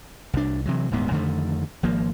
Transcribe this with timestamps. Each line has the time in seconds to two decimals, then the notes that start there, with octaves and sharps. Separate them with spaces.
0.33 C2 D4
0.65 C3 E3 F#3
0.91 D#1 D2 G#2 B3
1.11 F2 D3 D#3 A3
1.83 G#1 F3 A#3